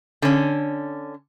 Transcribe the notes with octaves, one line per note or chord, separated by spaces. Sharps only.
D3 C#4